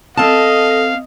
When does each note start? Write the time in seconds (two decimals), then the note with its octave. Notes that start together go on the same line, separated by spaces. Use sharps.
0.18 C4 A4 D#5 F5 A5